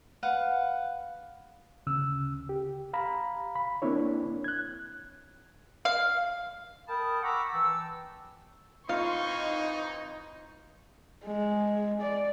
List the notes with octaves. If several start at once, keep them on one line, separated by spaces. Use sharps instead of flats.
B4 F5 F#5
D2 C#3 E6
G4
F5 A#5 B5
B5
A#3 C4 D4 E4 C#5
F#6 G#6
F5
A#4 G5 A5 B5 D#6
F#5 A#5 B5 C#6 D6 E6
E3 G5 A5 E6
E3 C4 D#4 F4 F5 C6 C#6
G#3
D5